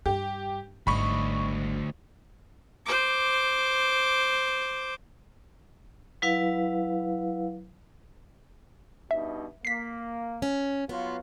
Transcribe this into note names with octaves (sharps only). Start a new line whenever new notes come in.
G2 G4
G#1 D2 G3 D#5 B5 C#6
C5 D6
F#3 E4 B4 F5
G2 B2 D#4 E5
A#3 B6 C7
C#4
F#3 B3 F4